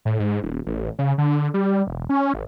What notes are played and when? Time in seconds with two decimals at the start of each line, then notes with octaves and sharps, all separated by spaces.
0.05 A2
0.19 G#2
0.43 D#1
0.66 A1
0.99 C#3
1.18 D3
1.54 G3
1.87 E1
2.09 C#4
2.34 G#1